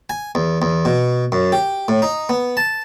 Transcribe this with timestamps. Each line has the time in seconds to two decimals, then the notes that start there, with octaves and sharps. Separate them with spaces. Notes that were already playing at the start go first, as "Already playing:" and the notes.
0.10 G#5
0.35 E2
0.62 E2
0.85 B2
1.32 F#2
1.52 G4
1.88 A2
2.02 D#4
2.29 B3
2.57 A5